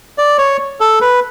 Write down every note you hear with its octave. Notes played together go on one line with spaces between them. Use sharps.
D5
C#5
A4
B4